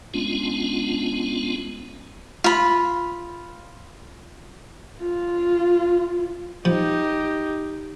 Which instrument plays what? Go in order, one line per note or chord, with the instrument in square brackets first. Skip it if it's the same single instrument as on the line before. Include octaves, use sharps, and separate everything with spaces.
[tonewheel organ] G#3 B3 C#4 D4 F4
[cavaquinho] F4 B5
[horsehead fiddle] F4
[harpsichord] F3 [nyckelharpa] D#4 G4